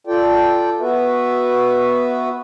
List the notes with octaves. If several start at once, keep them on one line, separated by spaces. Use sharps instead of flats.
F4 A4 D5 G5
B3 F#4 B4 E5